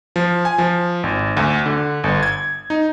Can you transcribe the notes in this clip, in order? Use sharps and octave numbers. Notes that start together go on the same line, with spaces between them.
F3
G#5
F3
G#1
D2
D3
G1
G#6
D#4